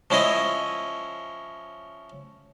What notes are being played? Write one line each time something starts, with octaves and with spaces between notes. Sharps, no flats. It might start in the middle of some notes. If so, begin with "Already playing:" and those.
F3 C#4 E4 D#5